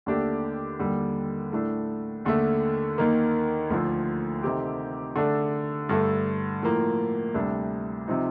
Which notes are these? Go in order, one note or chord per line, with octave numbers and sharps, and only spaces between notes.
D#2 D3 A3 D4 G4
D#2 D3 G3
A2 A3 D4
D#2 D3 A3
D#2 D#3 A#3
D2 D3 F3 A3
C3 D#3 A3 C4 G4
D3 A3 D4
G2 D3 A3
A2 F3 A#3
D2 C3 G3 D4
C3 F3 C4 D#4